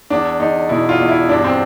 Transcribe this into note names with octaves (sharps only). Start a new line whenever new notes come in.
E2 D4
E2 D#4
B2 E4
F4
E2
E4
G2 D4
C4